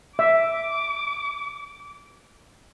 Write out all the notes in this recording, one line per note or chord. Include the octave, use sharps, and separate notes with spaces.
E5 D6